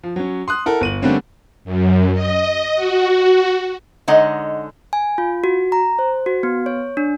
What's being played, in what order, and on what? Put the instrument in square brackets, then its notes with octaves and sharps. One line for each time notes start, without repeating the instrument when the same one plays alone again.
[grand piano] F3
F#3 C#4
C6 D#6 F#6
E4 A4 A#4 F#5
G1 D#7 F#7
D3 G3 A3 A#3 C4 C#4
[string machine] F#2
D#5
F#4
[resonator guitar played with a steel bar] D3 G#3 D#4 C#5 D#5 F#5
[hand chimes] G#5
F4
F#4
A#5
C5
F#4
B3
C#5
D4